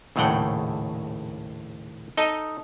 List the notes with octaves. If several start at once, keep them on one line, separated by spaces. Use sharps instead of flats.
A#1 D#2 A2 C#3 F#5 G5
D#4 A4 D#5